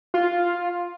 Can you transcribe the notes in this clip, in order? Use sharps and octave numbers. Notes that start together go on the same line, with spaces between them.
F4